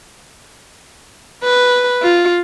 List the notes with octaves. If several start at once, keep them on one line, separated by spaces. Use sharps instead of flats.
B4
F4